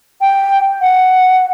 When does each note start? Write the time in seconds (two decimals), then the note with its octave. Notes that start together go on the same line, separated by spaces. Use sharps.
0.21 G5
0.81 F#5